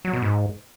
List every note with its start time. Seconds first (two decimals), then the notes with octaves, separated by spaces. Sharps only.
0.05 F#3
0.13 B2
0.22 G#2